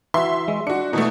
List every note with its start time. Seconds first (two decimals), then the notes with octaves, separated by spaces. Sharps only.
0.14 E3 E4 F#4 E5 C6
0.48 G#3
0.67 D4 F#4 C#7
0.93 B2 E3 A3 D#4